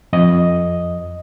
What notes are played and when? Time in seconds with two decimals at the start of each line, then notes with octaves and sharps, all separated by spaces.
0.13 F2 D#5